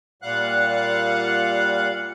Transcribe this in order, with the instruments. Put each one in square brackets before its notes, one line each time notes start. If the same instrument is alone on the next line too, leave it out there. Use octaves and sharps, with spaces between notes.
[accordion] A#2 G3 F5 F#5 F#6